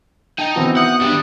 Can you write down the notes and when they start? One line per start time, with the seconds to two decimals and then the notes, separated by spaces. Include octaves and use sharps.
0.38 D#4 G5 A5
0.56 D#3 E3 B3 C4 F#4
0.76 E5 F#5 D#6 G6 C#7
1.01 G3 D4